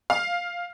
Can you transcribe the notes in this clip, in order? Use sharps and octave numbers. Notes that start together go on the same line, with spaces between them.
F5